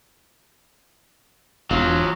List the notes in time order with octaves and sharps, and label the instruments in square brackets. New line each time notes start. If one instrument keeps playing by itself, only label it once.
[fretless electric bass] E1 [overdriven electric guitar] F#3 F4